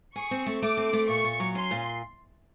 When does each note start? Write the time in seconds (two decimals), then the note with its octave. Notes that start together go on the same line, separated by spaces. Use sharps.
0.16 G#4 C#6
0.31 C4
0.46 A3
0.62 A3 D6
0.77 C4
0.93 A3
1.09 A#2 C#6
1.24 A#2
1.40 F#3
1.55 C#4 C6
1.71 A#2